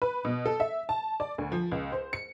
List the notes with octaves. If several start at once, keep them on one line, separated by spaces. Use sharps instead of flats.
B4
B2
A4
E5
A5
D5
D2
F3
C#2
C5
C#7